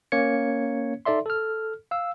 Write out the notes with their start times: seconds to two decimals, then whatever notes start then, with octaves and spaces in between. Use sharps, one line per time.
0.12 A#3 C#4 C#5 G#6 C#7
1.05 D#4 A4 D5 E5 C6
1.26 A4 F6
1.91 F5 E6